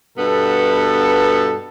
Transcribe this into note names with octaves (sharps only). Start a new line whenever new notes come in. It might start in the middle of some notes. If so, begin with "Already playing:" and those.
G2 B2 B3 A4